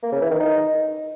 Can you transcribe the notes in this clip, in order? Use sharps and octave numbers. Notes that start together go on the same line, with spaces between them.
A#3
C#3
E3
D#3
D#4